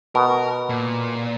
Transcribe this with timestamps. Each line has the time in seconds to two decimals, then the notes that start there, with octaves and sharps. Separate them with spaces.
0.15 B2 A#4
0.69 A#2